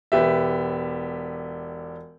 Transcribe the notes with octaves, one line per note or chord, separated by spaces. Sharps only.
E1 B3 G4 E5